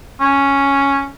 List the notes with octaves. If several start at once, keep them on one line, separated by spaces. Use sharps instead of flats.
C#4